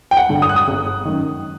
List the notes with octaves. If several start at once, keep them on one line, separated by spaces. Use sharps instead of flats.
G5
F#5
G2 D3
D#6
F#6
D#6
G1
F#2 D#3